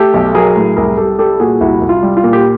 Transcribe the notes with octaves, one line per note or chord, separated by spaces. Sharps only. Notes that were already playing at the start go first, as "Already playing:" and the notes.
Already playing: A3 G4 A4
B1
F#3 G#4 A#4
A2
C2 G#4 A#4
C2 G4 A4
G3 G4 A4
A#2 F#4 G#4
C2 E4 F#4
C2
F4
G3
F4
A#2
G4